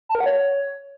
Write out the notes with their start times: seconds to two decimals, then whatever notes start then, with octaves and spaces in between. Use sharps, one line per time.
0.09 A5
0.15 A#4
0.20 F#5
0.26 C#5